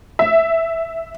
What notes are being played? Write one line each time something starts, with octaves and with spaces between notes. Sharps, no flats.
E5